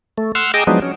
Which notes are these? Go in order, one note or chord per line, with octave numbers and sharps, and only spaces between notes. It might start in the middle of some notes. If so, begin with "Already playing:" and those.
A3
F#5 C6 E6 F6
G#4 D#5 G5 A#5 D6 E6
F3 F#3 G#3 B3 D4 D#4
C#4